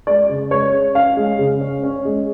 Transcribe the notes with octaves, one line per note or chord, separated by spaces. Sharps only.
G#3 D5
C#3
G#3 C#5
C#4
C#4 F5
G#3
C#3
C#4
C#4
G#3